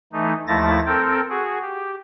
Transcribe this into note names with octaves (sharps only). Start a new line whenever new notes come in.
E3 A3 D#4
D#2 F3 A3 E4 A6 A#6
C4 A4 A#4 G5
F#4 G#4
G4